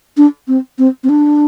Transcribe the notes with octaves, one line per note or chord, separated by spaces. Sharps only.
D4
C4
C4
C4
D4